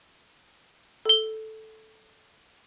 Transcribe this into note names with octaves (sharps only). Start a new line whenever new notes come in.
A4 G7